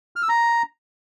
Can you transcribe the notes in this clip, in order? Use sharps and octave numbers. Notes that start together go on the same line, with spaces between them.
F6
E6
A#5